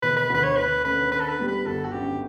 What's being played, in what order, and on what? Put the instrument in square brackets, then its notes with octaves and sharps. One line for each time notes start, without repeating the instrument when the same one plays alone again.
[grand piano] E1 [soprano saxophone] B4
[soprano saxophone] B4
[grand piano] D2 D3 [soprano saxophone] B4
[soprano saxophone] C#5
[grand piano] D2 [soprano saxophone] B4
[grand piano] D3 A3 C#4 [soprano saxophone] B4
[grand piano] D3 [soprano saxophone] B4
[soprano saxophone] A4
B4
[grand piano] G3 B3
[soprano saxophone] B4
[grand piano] G1 [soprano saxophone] A4
[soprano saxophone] F#4
[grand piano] F#2 D3 [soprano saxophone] G4